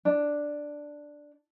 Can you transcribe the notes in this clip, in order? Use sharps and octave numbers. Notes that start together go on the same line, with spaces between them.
D4